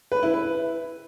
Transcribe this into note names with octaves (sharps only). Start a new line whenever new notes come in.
B4
E4
B4